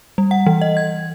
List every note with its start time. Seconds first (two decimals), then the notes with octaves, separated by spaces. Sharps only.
0.18 G3
0.31 F#5
0.46 E3
0.62 D#5
0.77 G#6